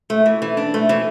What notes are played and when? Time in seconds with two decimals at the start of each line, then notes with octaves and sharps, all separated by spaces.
0.10 A3
0.26 E3
0.42 E3
0.57 D4
0.74 A3
0.89 E3